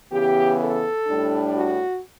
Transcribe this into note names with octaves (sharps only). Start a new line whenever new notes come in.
C#3 E3 B3 G4
A4
A2 G3 D4
F#4